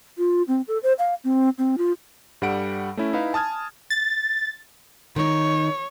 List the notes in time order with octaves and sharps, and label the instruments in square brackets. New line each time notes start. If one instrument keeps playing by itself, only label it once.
[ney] F4
C4
A4
C5
F5
C4
C4
F4
[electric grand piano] G2 G3 A4 F#5 D7
A3 C#4 E4
D#4 E4 B4 F5
G#5 A5 D#6 F6 G#6
[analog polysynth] A6
[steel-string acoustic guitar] D#3 D#4 [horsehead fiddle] C#5